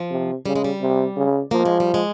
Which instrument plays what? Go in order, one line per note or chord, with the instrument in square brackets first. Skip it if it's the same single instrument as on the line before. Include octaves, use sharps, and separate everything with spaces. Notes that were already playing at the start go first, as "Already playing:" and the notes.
Already playing: [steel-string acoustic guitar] F3
[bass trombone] C3
[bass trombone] C#3 [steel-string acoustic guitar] G3
[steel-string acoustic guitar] G#3
G3
[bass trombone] C3
C#3
[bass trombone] F3 [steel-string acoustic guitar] A#3
[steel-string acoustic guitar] G#3
G3
G#3